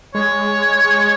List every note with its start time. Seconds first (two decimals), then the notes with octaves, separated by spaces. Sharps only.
0.15 G#3 C#5